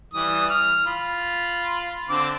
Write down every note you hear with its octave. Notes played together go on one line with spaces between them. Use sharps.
E3 G3 D#6
F6
F4 B5
D3 C4 D6